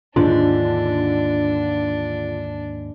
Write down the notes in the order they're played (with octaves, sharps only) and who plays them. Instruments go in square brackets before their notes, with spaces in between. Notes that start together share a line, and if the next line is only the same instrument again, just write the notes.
[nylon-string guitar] D#2 G#2 D5 [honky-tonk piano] D3 [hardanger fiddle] D4 [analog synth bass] F4